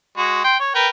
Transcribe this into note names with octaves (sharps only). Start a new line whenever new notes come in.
G#3 F#4
G5 C6
C#5
A#4 B4 G5